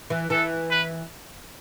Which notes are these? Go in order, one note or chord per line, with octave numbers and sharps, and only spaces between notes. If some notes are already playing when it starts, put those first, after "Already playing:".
E3
E3 A4
B4